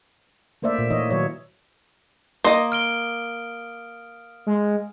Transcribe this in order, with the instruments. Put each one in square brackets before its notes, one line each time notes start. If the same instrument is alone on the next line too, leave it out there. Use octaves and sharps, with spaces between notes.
[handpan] A3 A#3 C5 D5 E5
A#2
E3 D#4 C#5 D#5
D#3 F#3 C#5 D#5
[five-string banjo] A#3 D#5 [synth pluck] C6 [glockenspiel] D#6
[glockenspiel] F6 D7 G7
[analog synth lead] G#3